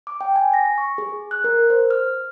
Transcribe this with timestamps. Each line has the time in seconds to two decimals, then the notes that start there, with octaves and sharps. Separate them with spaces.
0.07 D6
0.21 G5
0.36 G#5
0.54 A#6
0.78 C#6
0.98 G#4
1.31 F#6
1.44 A#4
1.70 C5
1.91 F6